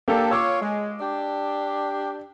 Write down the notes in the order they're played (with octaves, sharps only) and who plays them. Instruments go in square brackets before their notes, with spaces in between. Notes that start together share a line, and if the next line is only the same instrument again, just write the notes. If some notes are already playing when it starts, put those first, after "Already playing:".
[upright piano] A#3 G4 [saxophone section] D4 A4
[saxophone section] F4 C#5 [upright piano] D6 E6
[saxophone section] G#3
D4 G4